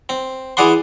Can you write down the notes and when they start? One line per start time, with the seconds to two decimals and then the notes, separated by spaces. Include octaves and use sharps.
0.09 C4
0.57 E3 G#4 D5 F#5 C6